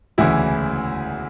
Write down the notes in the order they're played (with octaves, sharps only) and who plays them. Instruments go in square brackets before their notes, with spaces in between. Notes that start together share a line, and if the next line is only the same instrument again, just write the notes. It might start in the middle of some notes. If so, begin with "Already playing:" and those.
[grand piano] E1 D2 C#3 E3 E4